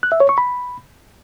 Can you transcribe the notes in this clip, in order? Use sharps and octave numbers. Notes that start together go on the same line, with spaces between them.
F#6
E5
C#5
C#6
B5